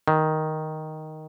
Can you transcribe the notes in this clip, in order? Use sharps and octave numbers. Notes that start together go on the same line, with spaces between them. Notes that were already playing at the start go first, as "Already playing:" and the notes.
D#3